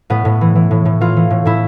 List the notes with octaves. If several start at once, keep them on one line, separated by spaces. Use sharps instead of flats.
A2 B3
A2
E3
E3
A2
A2
E3 F4
E3
A2
A2 E4